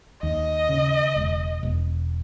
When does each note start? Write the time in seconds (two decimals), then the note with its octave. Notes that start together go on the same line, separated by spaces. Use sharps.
0.22 D#2 D#5
0.69 C#3
1.16 E1
1.63 E1